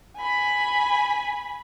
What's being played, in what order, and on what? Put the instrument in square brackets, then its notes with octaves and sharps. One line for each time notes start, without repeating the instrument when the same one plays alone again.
[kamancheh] G#5 B5